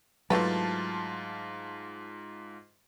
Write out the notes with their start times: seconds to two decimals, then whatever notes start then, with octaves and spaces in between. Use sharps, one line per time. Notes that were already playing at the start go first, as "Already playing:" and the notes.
0.30 G#2 E3 F#3 A3 F4 B4 A5